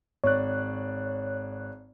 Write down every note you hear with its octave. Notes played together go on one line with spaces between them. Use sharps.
G#1 C#5 D5 F#6